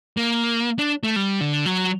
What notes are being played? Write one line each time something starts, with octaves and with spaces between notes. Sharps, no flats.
A#3
D4
A3
G3
D3
F#3